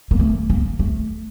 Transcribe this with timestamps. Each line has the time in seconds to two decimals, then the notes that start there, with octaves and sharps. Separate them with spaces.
0.11 A#3
0.19 A3
0.50 A#3
0.79 A3